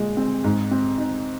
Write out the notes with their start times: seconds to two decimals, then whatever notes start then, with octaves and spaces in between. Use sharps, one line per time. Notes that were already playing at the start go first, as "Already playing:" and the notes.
Already playing: A#2 G#3
0.17 C4
0.44 G#2
0.71 C4
0.98 D#4